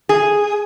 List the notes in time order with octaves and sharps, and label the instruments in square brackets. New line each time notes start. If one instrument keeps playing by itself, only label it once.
[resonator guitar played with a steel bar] G#4